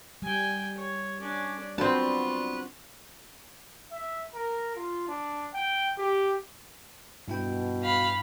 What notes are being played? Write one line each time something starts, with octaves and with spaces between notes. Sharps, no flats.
G3 G5 G#5
C#5
C#4 D4 D5
B3 C4 D4 F4 F#4 B4 D5 A5
E5
A#4
F4
D4
G5
G4
G2 B2 E4 G5
F5 B5